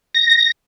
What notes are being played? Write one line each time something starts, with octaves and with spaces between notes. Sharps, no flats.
A#6